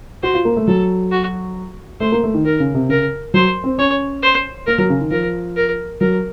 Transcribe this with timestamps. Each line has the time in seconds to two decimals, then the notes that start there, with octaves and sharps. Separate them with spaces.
0.23 F#4 C5
0.34 F4
0.45 A#3
0.57 A3
0.67 F#3 A4
1.11 F#4
2.00 A3 C5
2.12 A#3
2.23 A3
2.34 D#3
2.45 D#3 A#4
2.60 C#3
2.74 C3
2.89 C#3 A#4
3.34 F#3 C5
3.64 C4
3.78 C#4 C#5
4.22 C5
4.67 A#3 A#4
4.78 F#3
4.90 C#3
5.01 D#3
5.11 F3 A#4
5.56 A#4
6.01 F#3 A#4